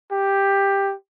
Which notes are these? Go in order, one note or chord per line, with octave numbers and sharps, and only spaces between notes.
G4